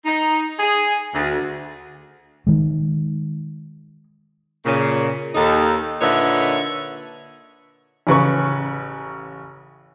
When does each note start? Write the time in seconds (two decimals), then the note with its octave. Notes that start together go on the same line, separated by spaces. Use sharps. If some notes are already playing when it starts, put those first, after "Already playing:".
0.06 D#4
0.59 G#4
1.14 D2
2.47 D#3 G#3
4.64 A#2 C#3
5.35 D#2 D#4 A4
6.00 A#2 D3 D#4 B4 C#5 E5
8.07 A1 C#3 B4 C#6